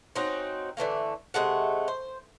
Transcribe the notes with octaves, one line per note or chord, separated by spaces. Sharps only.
C4 C#4 D#4 F#4
D3 E3 A3 A#3
C3 G#3 A3 F#5
C5